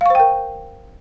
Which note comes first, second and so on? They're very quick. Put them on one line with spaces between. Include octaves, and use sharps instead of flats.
F5 C#6 C5 G5 A#4